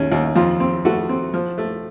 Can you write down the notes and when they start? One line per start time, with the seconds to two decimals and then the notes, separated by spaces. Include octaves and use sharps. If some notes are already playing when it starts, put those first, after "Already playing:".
Already playing: D#2 C#4
0.12 D#2
0.36 F2 F4
0.60 C4
0.85 A3 F#4
1.09 C4
1.34 F3
1.58 A3